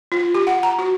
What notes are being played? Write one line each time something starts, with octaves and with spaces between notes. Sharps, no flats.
F4
G4
F#5
A#5
F#4